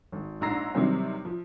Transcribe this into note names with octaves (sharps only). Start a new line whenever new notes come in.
G#1
A#1 G#2 A#5 E6 A#6 C7
C3 D#3 F#3 G3 C4
F3